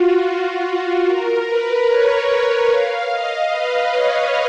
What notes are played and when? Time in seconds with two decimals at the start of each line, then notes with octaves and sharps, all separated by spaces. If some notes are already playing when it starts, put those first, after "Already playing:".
Already playing: F4 F#4
0.23 F4
0.63 F#4
1.05 A#4
1.45 B4
1.87 C#5
2.69 F5
3.10 D#5
3.50 B4
3.91 C#5